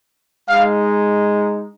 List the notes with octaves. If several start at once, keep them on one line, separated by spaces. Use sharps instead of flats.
G#3 D#4 F5